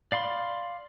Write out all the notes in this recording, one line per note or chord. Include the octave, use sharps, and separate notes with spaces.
D5 F5 B5 C6